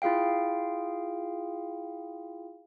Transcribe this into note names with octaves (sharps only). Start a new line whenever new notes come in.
E4 F4 G#4 F5 G5